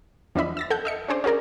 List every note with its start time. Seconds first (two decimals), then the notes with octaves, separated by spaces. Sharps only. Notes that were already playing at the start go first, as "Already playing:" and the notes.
0.35 E2 F3 D4 D#5 E5 B5
0.57 E6 A6 A#6
0.70 A4 F#5 G6
0.85 D#5 E5 C#7
1.08 C#4 D4 G#4 C5 D5
1.24 C#4 F#4 G#4 A#4 D5